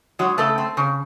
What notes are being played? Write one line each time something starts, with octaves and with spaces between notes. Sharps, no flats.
F#3 G#3 F#4
C#3 A3 A4
C4
C#3